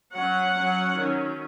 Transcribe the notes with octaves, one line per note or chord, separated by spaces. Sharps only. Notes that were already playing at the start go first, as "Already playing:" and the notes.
F#3 C#4 F#5
F#3 C#4
D#3 F#3 C#4